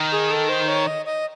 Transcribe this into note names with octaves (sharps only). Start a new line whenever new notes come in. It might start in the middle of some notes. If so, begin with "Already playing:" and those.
Already playing: D#3
G#4
A4
C5
C#5
D#5
D#5